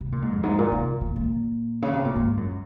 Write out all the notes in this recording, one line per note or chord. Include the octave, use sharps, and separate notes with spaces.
C3
A#2
G#2
F2
G#2
A#2
C3
A#2
A#2
C#3
C3
A#2
G#2
F#2